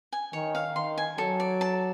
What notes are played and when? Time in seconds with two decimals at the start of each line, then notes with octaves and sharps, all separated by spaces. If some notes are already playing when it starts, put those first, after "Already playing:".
0.12 G#5
0.33 D#3 C#5
0.55 F5
0.75 D#3 C6
0.98 G#5
1.18 F#3 A4
1.40 D5
1.61 A5